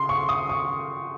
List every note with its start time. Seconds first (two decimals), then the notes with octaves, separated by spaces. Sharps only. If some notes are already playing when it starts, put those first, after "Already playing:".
Already playing: C#3 C6
0.09 C#6
0.29 D#6
0.49 C#6